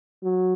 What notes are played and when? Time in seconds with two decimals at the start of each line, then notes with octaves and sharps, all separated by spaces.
0.23 F#3